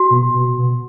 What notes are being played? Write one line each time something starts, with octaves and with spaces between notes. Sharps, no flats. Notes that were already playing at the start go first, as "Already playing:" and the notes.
Already playing: F#4
B2
B2
B2